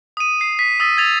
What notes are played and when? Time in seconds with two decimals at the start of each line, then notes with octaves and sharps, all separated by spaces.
0.17 D#6 D#7
0.41 C7
0.59 B6
0.80 D#6 E6 A6 B6
0.97 E6 G#6 A6 F7